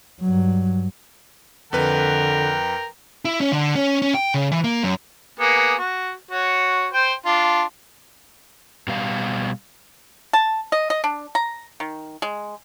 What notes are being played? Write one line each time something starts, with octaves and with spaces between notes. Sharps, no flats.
G2 F#3
F2 D3 A#4 B4 G5
E4
C#4
D3
C#4
C#4
G5
C#3
E3
A#3
F#2
A#3 B3 G#4
F#4
F#4 C#5
C5 G5
D4 F4
B2 G3 F5
A5
D#5
D#5
D4
A#5
D#3
G#3